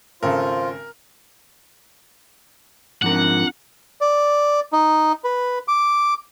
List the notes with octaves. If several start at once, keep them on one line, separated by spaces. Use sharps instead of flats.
G#1 C#3 F4 A4 A#4 C5
G#2 F3 C4 D4 F4 A#4 F#5
D5
D#4
B4
D6